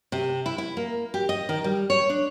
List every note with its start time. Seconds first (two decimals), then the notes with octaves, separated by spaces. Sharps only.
0.12 C3
0.46 E4
0.58 E4
0.77 A#3
1.14 G4
1.29 D#5
1.49 D#3
1.64 G3
1.90 C#5
2.09 D4